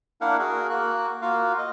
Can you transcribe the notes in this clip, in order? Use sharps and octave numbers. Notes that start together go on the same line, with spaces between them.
A#3 D4 E4 A#4 F5 F#5
F#4 G#4 A#4
A#3 F#4 F#6
A#3 F4 F#4 F5
D#5